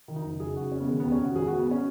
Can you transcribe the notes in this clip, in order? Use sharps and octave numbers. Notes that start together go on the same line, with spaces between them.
D#3
D#4
F#1
F#1 G#4
C#3 F#4
F#1 C#4
B3
D#3 G#3
D#2 B3
C#4
D#2 F#4
G#1 G#4
G#2 F#4
B3
C#4